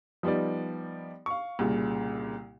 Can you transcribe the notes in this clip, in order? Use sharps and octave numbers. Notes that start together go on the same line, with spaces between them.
F3 G3 B3 D#4 D5
F5 C#6
C2 A#2 C#3